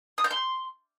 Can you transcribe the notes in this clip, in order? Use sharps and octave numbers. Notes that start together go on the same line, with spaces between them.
D#6
G6
C6